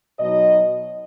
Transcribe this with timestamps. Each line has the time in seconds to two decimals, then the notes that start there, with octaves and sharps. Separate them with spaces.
0.19 B2 F#3 D#4 D#5